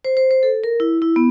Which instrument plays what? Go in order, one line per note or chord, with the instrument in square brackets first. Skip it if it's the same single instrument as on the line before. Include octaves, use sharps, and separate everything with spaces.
[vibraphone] C5
C5
C5
A4
A#4
E4
E4
B3